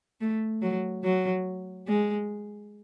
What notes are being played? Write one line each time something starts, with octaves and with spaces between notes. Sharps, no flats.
A3
F#3
F#3
G#3